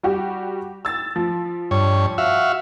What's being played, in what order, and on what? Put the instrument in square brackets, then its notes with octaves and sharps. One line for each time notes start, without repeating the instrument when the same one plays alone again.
[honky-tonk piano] G3 F#4 G4
E6 A6
F3
[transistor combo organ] G2 C#5
F#4 E5 F5